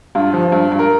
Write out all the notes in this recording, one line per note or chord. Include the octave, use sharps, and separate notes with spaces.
G2 F4
F3
G2
G2
A#4